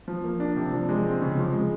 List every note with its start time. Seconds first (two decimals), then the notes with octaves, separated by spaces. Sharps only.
0.08 F3
0.24 A#3
0.40 D4
0.56 C3
0.73 F3
0.89 G#3
1.05 C4
1.22 C#3
1.37 F3
1.53 G#3